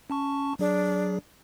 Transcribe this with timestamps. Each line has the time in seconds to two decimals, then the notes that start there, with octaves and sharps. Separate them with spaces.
0.10 C#4 A5 C#6
0.59 F#3 D4 G#4